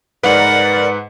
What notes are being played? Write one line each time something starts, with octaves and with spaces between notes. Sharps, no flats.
G#2 A#4 B4 D5 F#5